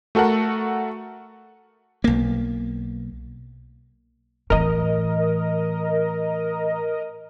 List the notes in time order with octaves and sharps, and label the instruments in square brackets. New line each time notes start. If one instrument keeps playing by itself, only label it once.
[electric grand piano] A3 F#4 A4 A#4 F#5
[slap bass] B1 A#3
[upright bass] A2 E3 [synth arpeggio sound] A#4 D#5